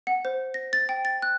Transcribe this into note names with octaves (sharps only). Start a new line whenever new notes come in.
F#5
C5
A#6
A6
G5
A6
F#6